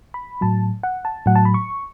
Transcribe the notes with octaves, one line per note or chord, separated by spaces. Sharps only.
B5
A2 F#3 A5
F#5
A5
A2 F#3 F#5
A5
B5
C#6